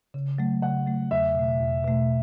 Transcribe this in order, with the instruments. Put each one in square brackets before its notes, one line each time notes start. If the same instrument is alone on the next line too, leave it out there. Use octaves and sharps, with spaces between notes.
[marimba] C#3
F#3 A3
[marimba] C#3 [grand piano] F#5
[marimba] F#3 A3
[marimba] E2 [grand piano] E5
[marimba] B2 A3
E2
B2 A3